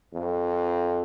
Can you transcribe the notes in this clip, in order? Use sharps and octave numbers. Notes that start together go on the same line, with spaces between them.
F2